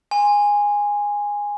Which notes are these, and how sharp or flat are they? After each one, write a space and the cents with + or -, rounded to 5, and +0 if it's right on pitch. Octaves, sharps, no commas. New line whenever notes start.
G#5 -15 C6 +0